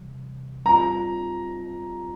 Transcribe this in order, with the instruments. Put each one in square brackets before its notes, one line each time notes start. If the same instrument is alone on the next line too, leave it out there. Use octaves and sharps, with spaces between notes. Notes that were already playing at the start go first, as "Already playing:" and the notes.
Already playing: [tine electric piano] C3 E3 G3
[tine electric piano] G3 C4 F4 [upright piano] A#5